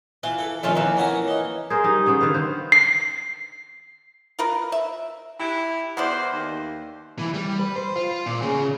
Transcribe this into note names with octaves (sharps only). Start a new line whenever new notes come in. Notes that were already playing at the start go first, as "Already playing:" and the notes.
E3 F4
A4
F2 D#3 A3 C#4 F4
E3 A#3
B3 C#4 A#5
D#4
G#4 A#4 C5
G3 D#4
C#3 B3 C5
D3 D#3 B4 F5
C5
C7
F4 A#4 B4
E5
E4 G4
E2 B3 E4 F#4 C5 D5
D#2
E3
G3
B4
C5
F4
A#2
C#3